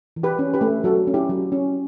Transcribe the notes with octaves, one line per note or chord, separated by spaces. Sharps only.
E3
G4 B4
C#4
G4 B4
A3
F#3 F#4 A4
C#4
E4 G4
F#3
C#4